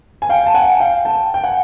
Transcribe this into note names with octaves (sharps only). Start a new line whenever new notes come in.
G#5
F5 G5
A5
F#5 G#5
F5 G5
G5 A5
G5
F#5 G#5